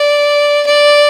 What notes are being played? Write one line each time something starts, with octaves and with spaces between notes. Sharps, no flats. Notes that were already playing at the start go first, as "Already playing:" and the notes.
Already playing: D5
D5